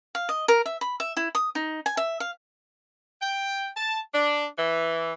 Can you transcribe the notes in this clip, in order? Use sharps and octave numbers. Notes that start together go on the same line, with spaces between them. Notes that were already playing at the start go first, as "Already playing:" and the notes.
F5
D#5
A#4
E5
B5
E5
E4
D#6
D#4
G#5
E5
F5
G5
A5
D4
E3